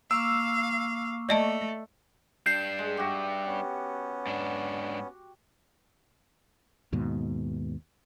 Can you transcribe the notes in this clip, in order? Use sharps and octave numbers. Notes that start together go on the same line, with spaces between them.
A#3 F5 C#6 D6 E6
A3 D5 D#5 A5
G3 D4 G6 C7
G#3
F#4 G4 E5
B3 C#4
G#2 D4
D#2 G#2 B2